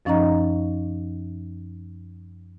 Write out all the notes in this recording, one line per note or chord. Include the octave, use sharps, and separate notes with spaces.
F#2 F3 C#4 D#4 D#5 A#5